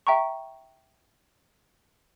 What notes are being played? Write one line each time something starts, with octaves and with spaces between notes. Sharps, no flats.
E5 G5 A#5 C#6